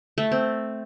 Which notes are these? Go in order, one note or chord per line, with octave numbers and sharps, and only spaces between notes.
A3
C4